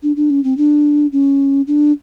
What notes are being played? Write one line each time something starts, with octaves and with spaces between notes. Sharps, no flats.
D4
D4
C#4
C4
D4
C#4
D4